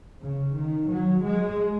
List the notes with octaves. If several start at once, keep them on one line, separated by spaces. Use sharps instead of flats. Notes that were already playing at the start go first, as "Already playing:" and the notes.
C#3
D#3
F#3
G#3